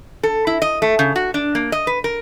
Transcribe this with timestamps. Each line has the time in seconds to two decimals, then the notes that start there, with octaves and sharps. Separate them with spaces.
0.23 A4
0.47 E4
0.62 D#5
0.82 A3
0.99 C#3
1.16 F#4
1.34 D4
1.55 A#3
1.72 D#5
1.87 B4
2.04 A#4